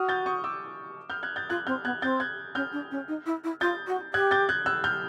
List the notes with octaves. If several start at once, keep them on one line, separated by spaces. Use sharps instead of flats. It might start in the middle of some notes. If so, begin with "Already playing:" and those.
Already playing: F#4 D#6 F6
G6 A6
C#6 D#6
D6 E6
F6 G6
F#6 G#6
G6 A6
F4 F#6 G#6
C4 F6 G6
B3 F#6 G#6
C4 G6 A6
F#6 G#6
C#4 F6 G6
D4
C#4
D#4
E4
E4
F4 G6 A6
F#4
G4 F#6 G#6
G6 A6
F#6 G#6
E6 F#6
F6 G6